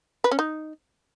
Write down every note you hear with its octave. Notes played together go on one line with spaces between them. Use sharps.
B4
C#4
D#4